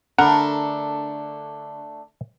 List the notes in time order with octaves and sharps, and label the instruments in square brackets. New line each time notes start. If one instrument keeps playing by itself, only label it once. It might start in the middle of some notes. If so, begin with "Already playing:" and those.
[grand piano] D3 B5 [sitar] A3 D4 [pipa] A#4 [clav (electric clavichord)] F#5